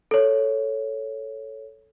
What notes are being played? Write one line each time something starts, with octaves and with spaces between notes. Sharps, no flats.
A4 C#5